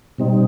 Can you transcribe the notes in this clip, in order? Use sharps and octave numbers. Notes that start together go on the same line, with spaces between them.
B2 G3 C4 D#4